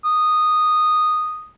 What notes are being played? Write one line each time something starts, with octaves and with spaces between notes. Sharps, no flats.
D#6